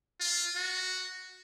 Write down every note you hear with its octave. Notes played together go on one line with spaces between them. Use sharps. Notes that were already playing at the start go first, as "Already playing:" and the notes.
F4
F#4